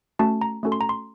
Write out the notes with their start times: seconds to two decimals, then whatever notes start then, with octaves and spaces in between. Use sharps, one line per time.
0.19 A3 C#4 F#4 A4 A5
0.41 A#5
0.63 A3 C#4 F#4 A4
0.72 C6
0.81 A#5
0.89 C6